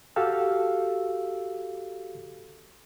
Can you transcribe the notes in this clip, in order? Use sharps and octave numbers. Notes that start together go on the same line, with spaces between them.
F#4 G4 A4 F5 E6